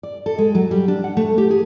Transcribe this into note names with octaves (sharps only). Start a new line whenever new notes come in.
D5
A4
G#3
F#3
G3
D4
F#5
A3
G4
G#4